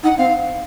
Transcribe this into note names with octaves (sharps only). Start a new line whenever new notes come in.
D#4 F#5
C4 F5